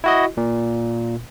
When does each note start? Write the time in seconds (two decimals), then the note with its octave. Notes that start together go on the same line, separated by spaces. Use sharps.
0.04 E4 F#4 D#5
0.37 A#2